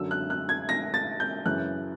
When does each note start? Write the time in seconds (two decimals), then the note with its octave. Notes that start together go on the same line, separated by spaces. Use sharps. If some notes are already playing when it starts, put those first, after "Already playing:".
Already playing: F#2 D3 F#3 E6
0.11 F#6
0.30 F#6
0.49 G#6
0.69 A#6
0.94 A6
1.20 G6
1.45 F#2 C#3 E3 F#6